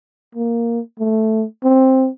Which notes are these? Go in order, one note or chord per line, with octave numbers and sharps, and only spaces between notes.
A#3
A3
C4